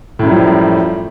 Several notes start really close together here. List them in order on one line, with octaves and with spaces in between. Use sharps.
A2 F#2 G3 F3